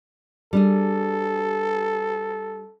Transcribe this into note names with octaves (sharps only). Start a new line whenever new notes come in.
G3 D4 G#4 A4